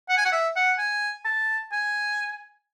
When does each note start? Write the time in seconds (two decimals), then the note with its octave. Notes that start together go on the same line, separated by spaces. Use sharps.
0.09 F#5
0.18 G#5
0.25 F#5
0.32 E5
0.56 F#5
0.78 G#5
1.25 A5
1.72 G#5